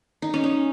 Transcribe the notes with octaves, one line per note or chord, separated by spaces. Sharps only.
D#4
C#4
D#4